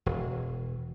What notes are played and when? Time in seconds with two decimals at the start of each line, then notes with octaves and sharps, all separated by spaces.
0.06 E1